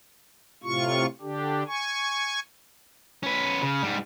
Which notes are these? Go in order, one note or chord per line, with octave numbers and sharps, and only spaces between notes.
A2 C3 F4 C#6
D3 D4 G4
G#5 C#6
C#4 B4
C#3
G#2 G3